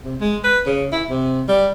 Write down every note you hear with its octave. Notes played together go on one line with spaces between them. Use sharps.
C3
G#3
B4
C#3
E4
C3
G3